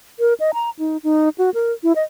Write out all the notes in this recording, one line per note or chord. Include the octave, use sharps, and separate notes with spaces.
A#4
D#5
A#5
D#4
D#4
F#4
A#4
E4
D#5